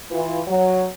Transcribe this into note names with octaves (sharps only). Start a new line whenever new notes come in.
E3 F4
F#3